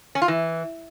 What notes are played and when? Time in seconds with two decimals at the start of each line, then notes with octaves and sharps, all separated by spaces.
0.15 C#4
0.22 F4
0.28 E3